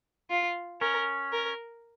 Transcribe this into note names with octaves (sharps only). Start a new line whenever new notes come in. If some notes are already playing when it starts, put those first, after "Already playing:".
F4
C#4 A#4
A#4